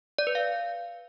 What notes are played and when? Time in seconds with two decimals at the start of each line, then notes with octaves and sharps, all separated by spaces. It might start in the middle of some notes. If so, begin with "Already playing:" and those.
0.19 D5
0.27 B4
0.35 F5